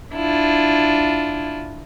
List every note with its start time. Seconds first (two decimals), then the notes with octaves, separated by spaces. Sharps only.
0.15 D4 E4 F4